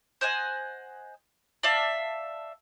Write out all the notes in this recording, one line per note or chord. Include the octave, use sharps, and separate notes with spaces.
C5 D#5 F#5 G#5
D5 E5 F5 A5